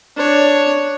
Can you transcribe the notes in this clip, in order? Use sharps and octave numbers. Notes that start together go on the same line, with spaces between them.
D4 C#5